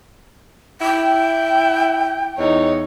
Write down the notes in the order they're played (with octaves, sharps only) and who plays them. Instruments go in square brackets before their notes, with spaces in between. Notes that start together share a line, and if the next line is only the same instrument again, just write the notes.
[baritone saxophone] E4 [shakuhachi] G5
[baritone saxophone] E2 [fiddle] D#4 C#5